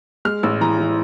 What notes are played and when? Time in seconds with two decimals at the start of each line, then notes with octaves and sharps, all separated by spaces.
0.25 G#3 F6
0.43 A1 E6
0.61 E3 A#5
0.79 E3